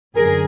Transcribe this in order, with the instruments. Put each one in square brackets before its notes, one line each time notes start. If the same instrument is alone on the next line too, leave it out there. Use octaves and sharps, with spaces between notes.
[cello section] F#2 D3 G#4 A#4